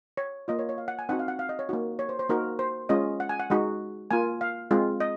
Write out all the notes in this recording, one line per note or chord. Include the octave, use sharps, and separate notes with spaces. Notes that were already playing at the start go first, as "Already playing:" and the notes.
C#5
A#3 F4 D#5
C#5
C#5
F5
F#5
G#5
C4 D#4 F#4 F#5
F5
F#5
F5
D#5
C#5
A#3 D#4 F#4
C#5
C5
C5
A#3 D#4 F#4 A#4
C5
G#3 C#4 F4 D#5
F#5
G#5
F#5
G#3 D#4 F#4
A#3 F4 G#5
F5
G#3 C4 F4
D#5